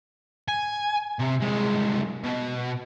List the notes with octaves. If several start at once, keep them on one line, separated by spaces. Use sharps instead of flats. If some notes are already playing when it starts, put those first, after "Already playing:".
G#5
C3
C2 G#3
B2